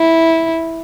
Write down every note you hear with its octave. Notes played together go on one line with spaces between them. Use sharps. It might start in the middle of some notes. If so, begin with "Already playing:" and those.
Already playing: E4